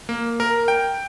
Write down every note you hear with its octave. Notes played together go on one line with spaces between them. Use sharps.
A#3
A#4
G5